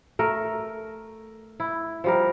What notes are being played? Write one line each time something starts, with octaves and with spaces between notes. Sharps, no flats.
A3 A#4
E4
F3 G3 A#4